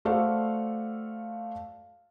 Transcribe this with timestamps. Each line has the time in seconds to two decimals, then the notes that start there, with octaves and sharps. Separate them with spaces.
0.05 A3 F#4 A4 C5 D5 F5